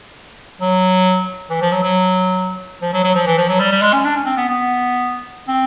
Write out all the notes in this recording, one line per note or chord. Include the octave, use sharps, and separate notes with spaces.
F#3
E3
F3
F#3
F#3
F3
F#3
F#3
F3
E3
F3
F#3
G3
G3
G#3
C#4
D4
C#4
C4
B3
B3
C4